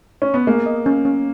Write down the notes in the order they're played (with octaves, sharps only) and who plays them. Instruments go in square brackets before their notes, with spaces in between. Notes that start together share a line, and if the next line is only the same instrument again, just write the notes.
[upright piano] C#4
B3
[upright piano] A#3 [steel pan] G#4
[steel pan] D#5
C#4
C#4